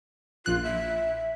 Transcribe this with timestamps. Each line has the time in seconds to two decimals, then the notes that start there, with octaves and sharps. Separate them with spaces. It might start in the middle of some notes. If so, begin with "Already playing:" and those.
0.46 A#1 F4 F#6
0.64 E5